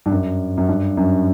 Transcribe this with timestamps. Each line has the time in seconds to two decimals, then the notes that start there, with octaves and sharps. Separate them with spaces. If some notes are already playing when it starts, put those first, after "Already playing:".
0.06 G2
0.11 F#2
0.57 F#2
0.68 G2
0.97 F#2